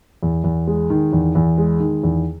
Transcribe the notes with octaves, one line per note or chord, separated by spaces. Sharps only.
E2
E2
G#3
D#3
E2
E2
G#3
D#3
E2